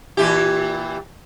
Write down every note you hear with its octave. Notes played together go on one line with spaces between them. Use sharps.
A#2 E3 G4